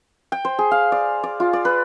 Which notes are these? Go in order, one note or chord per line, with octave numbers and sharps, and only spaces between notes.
G5
C5
G#4
F5
D5
D5
F4
D5
B4